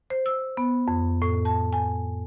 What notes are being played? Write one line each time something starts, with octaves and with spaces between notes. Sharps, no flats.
C5
E6
B3
F2
A2
A5
G#5